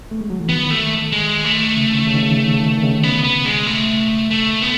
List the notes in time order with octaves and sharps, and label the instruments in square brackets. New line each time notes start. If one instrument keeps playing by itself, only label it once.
[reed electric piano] A3
G#3
F#3
E3
[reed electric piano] D#3 [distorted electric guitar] B3
[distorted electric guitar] A3
G#3
A3
[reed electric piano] C#3
D#3
C#3
D#3
C#3
D#3
C#3
D#3
C#3
D#3
C#3
D#3
C#3
D#3
C#3
[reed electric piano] C#3 [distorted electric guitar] B3
[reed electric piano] B2
[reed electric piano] C#3 [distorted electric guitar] B3
[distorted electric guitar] G#3
A3
A3
B3